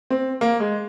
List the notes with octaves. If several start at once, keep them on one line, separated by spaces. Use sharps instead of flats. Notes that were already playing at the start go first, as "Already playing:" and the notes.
C4
A#3
G#3